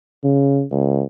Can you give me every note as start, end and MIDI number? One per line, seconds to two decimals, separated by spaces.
0.24 0.63 49
0.72 1.02 37